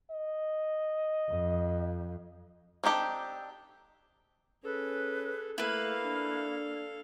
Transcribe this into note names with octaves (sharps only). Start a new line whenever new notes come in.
D#5
F2
C4 D4 D#4 G4 A4
C#4 G#4 A4 B4
A3 A#3 E4 A4 B4 F5
D4